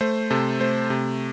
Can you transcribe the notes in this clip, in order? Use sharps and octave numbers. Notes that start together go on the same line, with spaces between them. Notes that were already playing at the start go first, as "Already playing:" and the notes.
A3 C5
C3 A4
A3 C5
C3